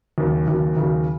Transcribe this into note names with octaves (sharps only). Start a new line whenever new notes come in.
D#2 C#3 F#3
D#2 C#3 F#3
D#2 C#3 F#3